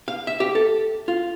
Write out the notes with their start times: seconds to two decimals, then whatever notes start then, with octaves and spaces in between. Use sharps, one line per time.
0.08 F5
0.27 E5
0.40 G4
0.55 A4
1.08 F4